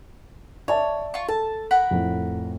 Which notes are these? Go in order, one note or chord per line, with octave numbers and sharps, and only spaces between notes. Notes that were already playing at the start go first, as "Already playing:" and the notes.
C#5 D5 E5 A5
F4 C#6
A4 A5
A#4 F#5 B5
F2 A2 A3